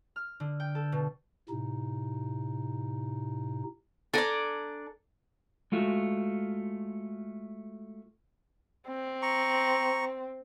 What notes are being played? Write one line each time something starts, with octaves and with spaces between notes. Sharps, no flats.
F6
D3
G5
A4
B2
A2 C3 D#4
D4 A4 D5 G#5 A#5
G#3 A3 F4 F#4
C4
A#5 C#6